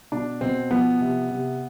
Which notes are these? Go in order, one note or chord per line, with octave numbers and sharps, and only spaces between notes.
B2 D4
B2 C4
F3 B3
C3
C3